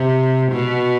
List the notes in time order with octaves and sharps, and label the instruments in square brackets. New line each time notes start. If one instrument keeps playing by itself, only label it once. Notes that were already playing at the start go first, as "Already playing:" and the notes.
Already playing: [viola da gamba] C3
B2